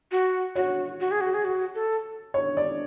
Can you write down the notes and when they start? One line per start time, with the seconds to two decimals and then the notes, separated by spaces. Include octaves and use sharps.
0.11 F#4
0.55 F#4 C#5
1.00 F#4
1.11 G#4
1.21 F#4
1.34 G#4
1.45 F#4
1.75 A4
2.34 C#5
2.57 D5